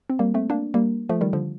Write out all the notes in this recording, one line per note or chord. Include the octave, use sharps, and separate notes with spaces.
C4
G3 A#3
A3 C4
A#3 D4
G3 A#3
F3 A3
D#3 G3
D3 F3